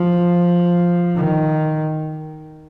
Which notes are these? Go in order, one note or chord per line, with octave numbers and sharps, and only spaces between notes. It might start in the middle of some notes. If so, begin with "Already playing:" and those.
Already playing: F3
D#3